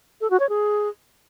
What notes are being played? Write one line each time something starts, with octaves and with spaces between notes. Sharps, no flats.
A4
F#4
C#5
G#4